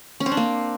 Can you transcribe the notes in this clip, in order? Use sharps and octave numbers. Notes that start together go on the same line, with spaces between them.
C#4
C4
D4
A#3